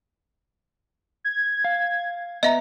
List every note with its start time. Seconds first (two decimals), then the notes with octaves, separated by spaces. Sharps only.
1.24 G#6
1.64 F5
2.43 B3 D#5 E5 A#5